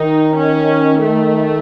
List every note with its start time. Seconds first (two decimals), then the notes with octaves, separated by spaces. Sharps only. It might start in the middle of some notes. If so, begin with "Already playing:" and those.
Already playing: D#3 D#4
0.36 C#4
1.00 A3